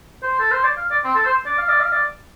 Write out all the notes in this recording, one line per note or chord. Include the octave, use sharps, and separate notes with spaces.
C5
A4
C5
D5
F5
D5
C4
A4
C5
D5
F5
D5
F5
D5